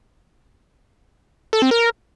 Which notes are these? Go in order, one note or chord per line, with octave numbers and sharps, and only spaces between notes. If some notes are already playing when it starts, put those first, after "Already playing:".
A4
C4
A#4